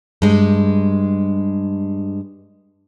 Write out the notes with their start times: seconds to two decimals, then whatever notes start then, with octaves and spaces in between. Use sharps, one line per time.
0.22 G2 G#3